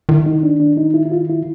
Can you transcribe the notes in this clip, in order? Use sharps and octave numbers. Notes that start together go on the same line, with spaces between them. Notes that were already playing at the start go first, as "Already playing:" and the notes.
D#3 E4
D#4
D4
D4
D#4
E4
E4
F4
E4